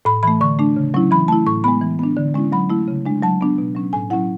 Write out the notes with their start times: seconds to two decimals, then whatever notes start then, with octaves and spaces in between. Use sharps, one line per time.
0.05 A2 B5
0.23 E3 A3 B5
0.41 D3 C#6
0.59 A3 D4
0.76 C#3
0.94 F#3 C#4 E4
1.11 E3 B5
1.28 A3 E4 A5
1.47 A2 C#6
1.64 G#3 B3 B5
1.81 E3
1.99 B3 D4
2.17 D3
2.34 G#3 C#4 E4
2.52 F#3 B5
2.70 A3 E4
2.88 C#3
3.06 G#3 D4
3.22 F#3 A5
3.41 B3 D4
3.58 B2
3.75 F#3 C#4
3.93 A2 G#5
4.10 F#3 C#4 E4 F#5